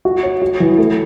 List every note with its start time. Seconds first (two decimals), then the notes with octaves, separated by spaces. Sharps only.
0.05 F#4
0.23 C#5
0.42 F#4
0.60 E3
0.78 A3